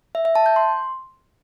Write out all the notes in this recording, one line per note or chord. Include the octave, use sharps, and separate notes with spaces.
E5
E5
A5
G6
C6